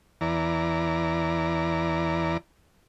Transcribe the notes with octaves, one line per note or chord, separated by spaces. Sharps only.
E2 E3 D5 A#5